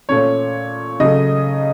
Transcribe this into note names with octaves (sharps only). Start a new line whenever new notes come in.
A#2 A3 C#4 C#5
C#3 F#3 A3 D#5